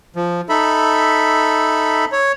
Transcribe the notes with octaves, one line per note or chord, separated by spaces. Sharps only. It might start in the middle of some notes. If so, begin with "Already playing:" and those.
F3
D#4 A4 E5 B5
C#5